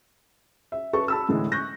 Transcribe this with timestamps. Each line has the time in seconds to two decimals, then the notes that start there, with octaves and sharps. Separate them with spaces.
0.72 E5
0.93 A4 B4 A5 C#6
1.08 A5 B5 E6
1.29 A2 D3 E3 G#3
1.52 C#6 F#6 G6 A#6